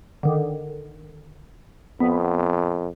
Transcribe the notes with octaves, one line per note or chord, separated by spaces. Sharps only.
D3 D#3
F2 B3